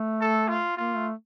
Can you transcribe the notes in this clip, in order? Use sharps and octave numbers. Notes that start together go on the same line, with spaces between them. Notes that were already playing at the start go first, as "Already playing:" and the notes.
Already playing: A3
A4
F4
A#3 F4
A3